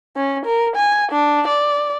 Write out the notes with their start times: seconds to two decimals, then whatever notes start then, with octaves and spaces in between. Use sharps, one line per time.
0.16 C#4
0.46 A#4
0.76 G#5
1.12 D4
1.48 D5